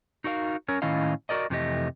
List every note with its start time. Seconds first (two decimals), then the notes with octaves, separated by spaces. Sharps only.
0.24 D#4 F#4 A#4 E5 F5
0.68 C#4 A#4 C#5
0.82 A2 D#3 C#4 E4 D#5 F5
1.29 F#4 A#4 D5 D#5
1.50 F2 C3 E3 A3 G4 D#5